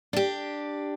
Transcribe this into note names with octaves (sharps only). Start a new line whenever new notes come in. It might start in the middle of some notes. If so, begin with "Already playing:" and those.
D4 G4